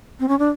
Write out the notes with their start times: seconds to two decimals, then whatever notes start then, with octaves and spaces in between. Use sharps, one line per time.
0.20 C4
0.28 C#4
0.39 D4